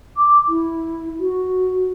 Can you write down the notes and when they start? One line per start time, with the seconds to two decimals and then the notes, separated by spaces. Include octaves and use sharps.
0.17 D6
0.49 E4
1.20 F#4